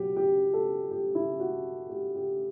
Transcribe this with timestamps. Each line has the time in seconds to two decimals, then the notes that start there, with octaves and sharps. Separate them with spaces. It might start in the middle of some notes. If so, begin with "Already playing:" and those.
Already playing: B2 F#3 G4
0.16 G4
0.54 A4
0.91 G4
1.15 E4
1.40 F#4
1.89 G4
2.15 G4